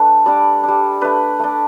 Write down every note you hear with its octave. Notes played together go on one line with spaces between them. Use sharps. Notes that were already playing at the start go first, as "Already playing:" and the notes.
Already playing: A3 D4 B4
G3 D4 D5
D4
G3
A3 D4 B4
A3 D4